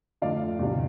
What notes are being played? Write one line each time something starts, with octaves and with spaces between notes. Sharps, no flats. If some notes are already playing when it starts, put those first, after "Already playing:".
F2 D3 A3 D4 D5 F5
E2 C3 G3 D4